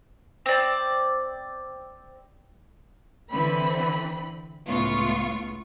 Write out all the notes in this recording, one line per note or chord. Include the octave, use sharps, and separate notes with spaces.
C4 D5
D3 E3 C4 B5
C#2 A2 B3 F4 C#6